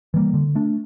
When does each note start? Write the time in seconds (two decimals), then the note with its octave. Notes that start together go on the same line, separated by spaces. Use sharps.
0.14 E3 G3 A#3
0.34 D3
0.55 A3 D4